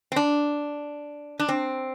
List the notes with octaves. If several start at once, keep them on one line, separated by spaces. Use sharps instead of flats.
C4
D4
D4
C4